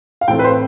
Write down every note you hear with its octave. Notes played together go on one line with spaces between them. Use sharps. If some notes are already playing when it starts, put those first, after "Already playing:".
F5
A2 E3 A3 C4 G5
B4
C5